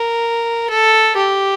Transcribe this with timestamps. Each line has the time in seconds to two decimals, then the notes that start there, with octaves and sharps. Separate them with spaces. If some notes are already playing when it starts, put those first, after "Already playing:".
Already playing: A#4
0.70 A4
1.17 G4